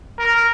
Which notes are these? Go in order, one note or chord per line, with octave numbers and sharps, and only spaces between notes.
A#4